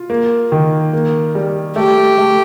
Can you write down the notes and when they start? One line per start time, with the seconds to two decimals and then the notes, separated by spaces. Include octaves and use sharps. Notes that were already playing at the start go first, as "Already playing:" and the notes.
Already playing: F4
0.10 A#3
0.52 D#3
0.93 A#3
1.35 G3
1.76 A3 G4
2.18 A3